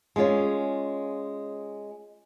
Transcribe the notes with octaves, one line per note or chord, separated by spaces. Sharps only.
G#3 C#4 F4 C#5